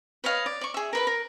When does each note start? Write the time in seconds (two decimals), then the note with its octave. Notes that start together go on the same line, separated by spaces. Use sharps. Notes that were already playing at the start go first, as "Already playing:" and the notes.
0.24 B4 C#5 D#5 F5
0.46 D5
0.61 D5 C#6
0.74 G#4 E5
0.93 A#4 B4 B5
1.07 A#4